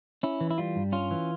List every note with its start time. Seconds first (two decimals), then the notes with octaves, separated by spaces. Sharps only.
0.23 C#4 E4
0.41 E3
0.51 E4
0.58 G3 F4
0.76 G2
0.92 C#4 F4
1.11 E3